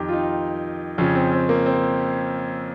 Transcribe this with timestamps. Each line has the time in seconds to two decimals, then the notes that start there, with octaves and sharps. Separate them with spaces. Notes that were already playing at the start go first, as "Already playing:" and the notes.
Already playing: F2 D#3 G4 A#4
0.09 F4
0.13 D#4
0.98 F2 C#3 F3 C#4
1.15 C4
1.32 C4
1.49 A#3
1.66 C4